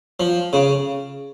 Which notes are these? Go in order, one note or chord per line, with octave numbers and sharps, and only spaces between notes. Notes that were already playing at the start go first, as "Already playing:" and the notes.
F3
C#3